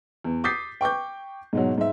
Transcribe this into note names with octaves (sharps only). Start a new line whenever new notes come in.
E2
D6 D#6 G6 A6 B6 C7
G5 C#6 D6 G6
G#2 B2 F#3
G#2 E5